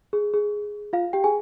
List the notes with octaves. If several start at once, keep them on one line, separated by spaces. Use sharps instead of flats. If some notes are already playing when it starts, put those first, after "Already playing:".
G#4
G#4
F4 F5
G4 G5
G#4 G#5